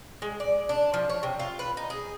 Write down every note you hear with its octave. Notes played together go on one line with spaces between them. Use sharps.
G#3
D5
D4
F3
C#5
C3
F4
B4
D#4
G#4